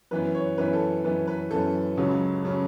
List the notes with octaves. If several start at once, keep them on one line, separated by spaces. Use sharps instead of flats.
F#2 E3 B3 B4
C#5
F#2 E3 B3 B4
A4
F#2 E3 B3 B4
B4
F#2 E3 B3 A4
C#2 C#3 F#3
C#3 F#3